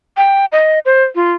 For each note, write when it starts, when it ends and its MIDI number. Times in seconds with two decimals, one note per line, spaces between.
0.17 0.45 79
0.52 0.79 75
0.85 1.04 72
1.15 1.33 65